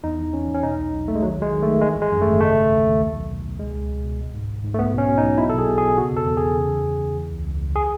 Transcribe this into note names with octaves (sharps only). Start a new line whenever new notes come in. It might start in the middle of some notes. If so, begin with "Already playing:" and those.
E2 D#4
E3
E2 C#4
E2
C#4
B2 D#4
B1
B1
B1 A3
G#3
D#3 F#3
D#2 G#3
D#3
A3
D#3
E3 G#3
G#1
G#3
F#2
A3
G#1
C#3 A3
C#3
D#2
D#2
B1
B1
B2
B2
C#2 G#3
C#2
C#2
B2
G#1
G#2
G#1
G#2
A3
B1 B3
B2
C#4
B2
D#4
B1
B2 E4
B1 A4
G#4
B2
G#4
B2
C#3 F#4
E2 A4
E2
E2 G#4
C#3
E3
C#3
E2
E3
C#2
C#2
C#2
G#4